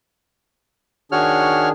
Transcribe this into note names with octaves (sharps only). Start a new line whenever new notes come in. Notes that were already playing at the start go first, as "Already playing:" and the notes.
D#3 D4 F#4 G#4 C#5 F6